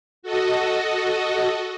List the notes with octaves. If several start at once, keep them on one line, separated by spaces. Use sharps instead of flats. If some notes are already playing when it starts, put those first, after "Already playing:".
F#4 A4 D#5